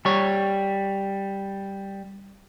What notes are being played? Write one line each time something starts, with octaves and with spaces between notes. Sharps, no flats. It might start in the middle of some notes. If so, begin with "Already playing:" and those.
G3 C#5